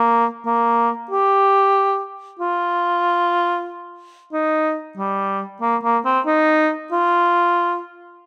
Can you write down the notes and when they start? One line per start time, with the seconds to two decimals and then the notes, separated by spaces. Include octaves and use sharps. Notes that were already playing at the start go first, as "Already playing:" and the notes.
Already playing: A#3
0.46 A#3
1.10 G4
2.39 F4
4.33 D#4
4.97 G3
5.61 A#3
5.83 A#3
6.05 C4
6.26 D#4
6.92 F4